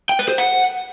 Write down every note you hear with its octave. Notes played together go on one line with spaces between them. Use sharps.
G5
B4
C5
F#5